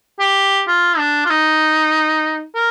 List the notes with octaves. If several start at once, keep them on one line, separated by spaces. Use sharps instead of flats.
G4
F4
D4
F4
D#4
A#4